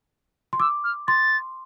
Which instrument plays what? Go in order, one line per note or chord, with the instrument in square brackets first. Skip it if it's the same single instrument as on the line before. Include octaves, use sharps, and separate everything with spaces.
[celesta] C6
[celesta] D6 [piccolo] E6
[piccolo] F6
[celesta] C6 [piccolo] A6